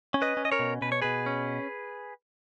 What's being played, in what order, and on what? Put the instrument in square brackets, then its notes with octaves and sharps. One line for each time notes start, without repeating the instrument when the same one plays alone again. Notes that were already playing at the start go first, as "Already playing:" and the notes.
[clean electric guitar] C#4
B4 D#5
C#4
D#5
A#4 C#5
B2
B2 B4
C#5
B2 G#4 B4
C#4